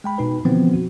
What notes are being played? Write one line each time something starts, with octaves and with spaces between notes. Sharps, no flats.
G#3 G5 B5
B2 D#4 B4
B2 D3 E3 F3 B3 C4
F#4